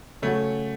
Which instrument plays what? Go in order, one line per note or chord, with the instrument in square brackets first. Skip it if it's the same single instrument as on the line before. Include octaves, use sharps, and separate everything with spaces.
[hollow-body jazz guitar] C#3 F#3 C#4 F#4 [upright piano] A3